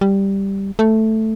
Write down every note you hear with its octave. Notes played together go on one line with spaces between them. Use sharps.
G3
A3